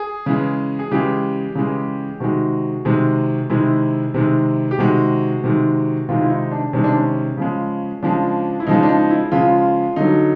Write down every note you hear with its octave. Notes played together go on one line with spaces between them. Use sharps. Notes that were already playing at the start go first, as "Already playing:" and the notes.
Already playing: G#4
C#3 E3 G#3
G#4
C#3 E3 G#3 G4
C#3 E3 G#3
C3 D#3 G#3 F#4
C3 D#3 G#3
C3 D#3 G#3 E4
C3 D#3 G#3
G4
C3 D#3 G#3 F#4
C3 D#3 G#3
C3 D#3 G#3 F4
E4
D#4
D4
C3 D#3 G#3 C#4
D4
C#4
C#3 F3 G#3
C#3 F3 G#3 D4
E4
C#3 F3 G#3 D#4
D4
D#4
E4
C#3 F3 G#3 F4
D3 F#3 D#4